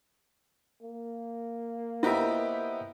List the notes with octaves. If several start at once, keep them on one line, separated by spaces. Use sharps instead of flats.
A#3
B3 E4 F4 G4 A#4 C5 D#5 E5